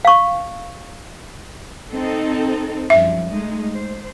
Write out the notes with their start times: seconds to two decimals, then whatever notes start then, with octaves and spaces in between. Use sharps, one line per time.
0.05 F5 C#6
1.92 C4 D#4 A4
2.90 F#2 F3 G3 E5
3.30 G#3 A3 D#4
3.73 C5